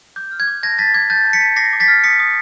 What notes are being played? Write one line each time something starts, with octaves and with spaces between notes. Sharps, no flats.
D6 G6
F6
G#6
D6
A5 G#6 A#6
A5 A6 B6
D6 G#6
A5 G6 A6
A5
B6 C#7
A5
D6 A#6 C7
D6
A6 B6
F6
D#6 B6 C#7
D#6